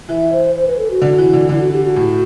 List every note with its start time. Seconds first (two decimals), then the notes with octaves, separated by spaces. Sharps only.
0.09 E3 E5
0.32 C5
0.55 C5
0.67 B4
0.78 A4
0.90 F#4
1.01 D3
1.18 E3
1.33 D3
1.49 D3 E4
1.60 F#4
1.72 G4
1.84 F#4
1.96 A2